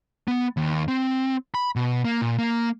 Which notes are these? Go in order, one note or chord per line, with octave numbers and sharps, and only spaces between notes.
B3
D#2
C4
B5
B2
A#3
A#2
A#3